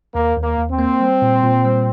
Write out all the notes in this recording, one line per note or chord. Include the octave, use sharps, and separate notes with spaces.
D#2 A#3
D#2
A#3
D#2
C4
A#3
G3
A#2
A#2
G3